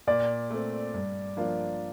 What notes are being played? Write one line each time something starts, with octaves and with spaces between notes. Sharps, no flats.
A#2 D5
A3 C4
G2
F3 A#3 D4 F4